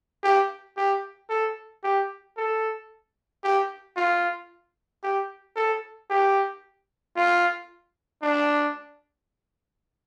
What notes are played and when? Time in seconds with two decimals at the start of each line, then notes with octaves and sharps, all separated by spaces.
0.24 G4
0.77 G4
1.30 A4
1.84 G4
2.37 A4
3.44 G4
3.97 F4
5.03 G4
5.56 A4
6.10 G4
7.16 F4
8.22 D4